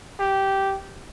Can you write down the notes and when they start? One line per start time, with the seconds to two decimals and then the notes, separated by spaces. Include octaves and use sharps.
0.20 G4